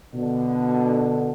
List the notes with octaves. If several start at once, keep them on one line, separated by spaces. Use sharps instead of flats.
B2 D3